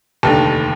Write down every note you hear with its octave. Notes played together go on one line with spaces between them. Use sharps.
F1 D#2 D3 A5